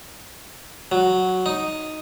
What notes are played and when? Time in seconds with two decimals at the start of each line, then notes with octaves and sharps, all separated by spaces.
0.92 F#3
1.46 D#4